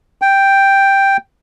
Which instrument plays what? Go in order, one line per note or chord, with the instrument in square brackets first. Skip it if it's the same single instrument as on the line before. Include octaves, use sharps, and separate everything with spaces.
[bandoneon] G5